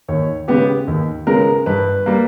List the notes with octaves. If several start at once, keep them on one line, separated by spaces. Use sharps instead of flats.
D#2 C#5
C#3 G#3 B3 G4
D#2
C#3 G#3 B3 A#4
G2 B4
G3 A#3